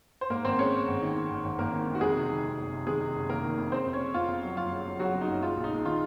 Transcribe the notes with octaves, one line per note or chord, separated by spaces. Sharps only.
C5
G#2 A#3 A#4
G#1 C4 C5
G#3 C#4 C#5
G#3
G#1
D#3
D#3
G#1
G#1
G#1 A#3 A#4
D#3
D#3
F#4
F2 G#3 G#4
C3
D#3
F2
F#1
C3
D#3 G#3 G#4
C3
F#1
D#3 A#3 A#4
D#3
F2
C#3 C4 C5
F2
C#4 C#5
C#3
F2 F4 F5
F2
F#3
F#1 F4 F5
C#3
F#3
C#3 F#3 F#4
C#3
D#4
F#1
G#3 F4
A#1
D#4
G#3
D#3 F4